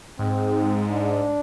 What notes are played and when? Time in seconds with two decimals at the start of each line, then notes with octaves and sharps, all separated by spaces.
0.18 G#2 C4
0.90 D4